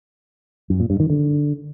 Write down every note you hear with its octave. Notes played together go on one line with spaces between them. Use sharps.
F#2
A#2
G2
D#3
D3